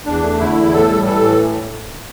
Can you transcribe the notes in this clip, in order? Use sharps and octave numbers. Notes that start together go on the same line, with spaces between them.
E2 D4
A3
D3 E4
E2
A2 A4
G3
E3 A4
A2